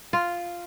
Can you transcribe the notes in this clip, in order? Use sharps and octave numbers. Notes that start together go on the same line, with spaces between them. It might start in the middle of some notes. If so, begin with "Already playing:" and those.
F4